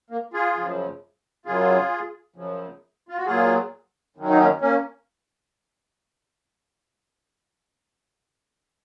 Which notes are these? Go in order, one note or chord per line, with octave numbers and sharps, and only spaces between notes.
A#3
F4 G#4
F#2 C#3 F3
F#2 C#3 F#3 F4 G#4
F#2 C#3 F3
F4
F#4
A#2 F#3 F4 G#4
F#2 D#3 F#3
D#4
A#3 C#4
A#3 C#4